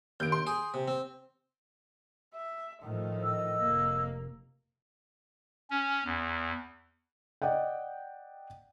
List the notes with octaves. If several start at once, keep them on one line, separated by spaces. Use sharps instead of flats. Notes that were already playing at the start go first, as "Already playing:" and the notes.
D#2 G6 D7
C6
G#4
C3
C4
E5
A2 D#3 F3 A3
D#5 E6
F1 A#3
C#4
E2
D5 D#5 F#5 G5